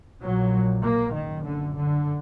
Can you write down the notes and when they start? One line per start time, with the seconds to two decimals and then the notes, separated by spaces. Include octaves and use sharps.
0.23 A#1 A#2 F#3
0.84 A#3
1.14 F#1 F#2 D#3
1.45 D3
1.76 D3